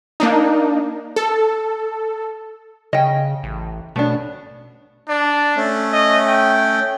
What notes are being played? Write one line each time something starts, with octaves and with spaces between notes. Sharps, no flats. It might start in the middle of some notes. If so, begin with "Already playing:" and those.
A#3 D4 D#4
A4
C#3 D#5 G5
A1
B2 A3 C#4 D4
D4 D5
A3 C#4
D#5
G5